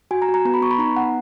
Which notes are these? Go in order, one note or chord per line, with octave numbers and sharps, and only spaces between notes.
F#4 G#5
A#5
F#4
A#5
B3 A#5
B5
B3 C#6
B5
D#4 A#5
B3 F#5